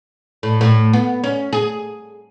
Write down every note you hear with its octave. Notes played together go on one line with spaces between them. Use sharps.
A2
A2
B3
C#4
G#4